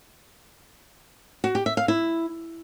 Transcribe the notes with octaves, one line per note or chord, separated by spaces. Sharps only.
F#4
G4
E5
F5
E4